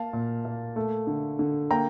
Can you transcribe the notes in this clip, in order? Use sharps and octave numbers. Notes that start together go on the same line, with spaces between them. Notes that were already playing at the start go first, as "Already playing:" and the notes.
Already playing: A#3 F5 A5
A#2
A#3
A3
D3
D3
A#3 G5 A#5